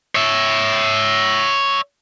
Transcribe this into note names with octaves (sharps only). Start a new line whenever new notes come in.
C#5 E5